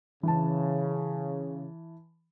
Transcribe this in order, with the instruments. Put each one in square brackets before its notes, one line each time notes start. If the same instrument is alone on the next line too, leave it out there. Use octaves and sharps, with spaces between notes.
[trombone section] C#3 [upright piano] E3 A5